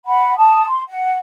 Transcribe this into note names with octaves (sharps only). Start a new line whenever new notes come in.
F#5 B5
A5 D#6
C6
F#5